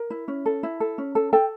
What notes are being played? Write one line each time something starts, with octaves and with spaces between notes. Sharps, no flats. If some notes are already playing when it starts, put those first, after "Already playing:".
Already playing: A#4
E4
C#4
A4
E4
A4
C#4
A4
A4 G5